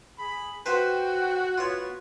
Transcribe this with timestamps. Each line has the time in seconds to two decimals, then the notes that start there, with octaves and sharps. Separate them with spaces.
0.19 G#4 B5
0.66 F#4 B4 C5 G5
1.58 B3 F4 C#5